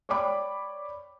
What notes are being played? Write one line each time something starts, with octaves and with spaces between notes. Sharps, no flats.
C#5 D5 G5 B5 D6